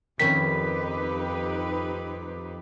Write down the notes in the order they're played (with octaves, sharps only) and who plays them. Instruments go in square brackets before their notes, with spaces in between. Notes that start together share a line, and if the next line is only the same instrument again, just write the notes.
[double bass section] F2 [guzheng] D#3 C#4 E4 [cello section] D#4 G4 B4 [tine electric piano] B6